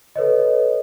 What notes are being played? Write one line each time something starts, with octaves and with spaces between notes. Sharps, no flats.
A4 B4 C#5 D#5